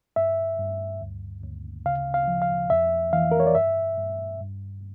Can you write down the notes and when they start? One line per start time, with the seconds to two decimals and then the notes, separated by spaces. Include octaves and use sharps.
0.16 G2 E5
0.59 G2
1.01 D2
1.44 D2
1.86 C#3 F5
2.14 F5
2.28 F3
2.42 F5
2.70 F2 E5
3.13 E3 F5
3.32 A#4
3.40 C#5
3.47 D5
3.55 G2 E5
3.97 G2
4.40 G2